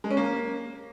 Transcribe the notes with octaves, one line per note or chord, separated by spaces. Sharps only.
G#3
C#4
A#3